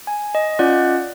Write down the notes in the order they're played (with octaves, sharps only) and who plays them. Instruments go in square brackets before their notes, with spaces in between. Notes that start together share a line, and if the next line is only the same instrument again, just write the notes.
[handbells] G#5
D#5
C#4 F4 D5 D#5 F#5 F#6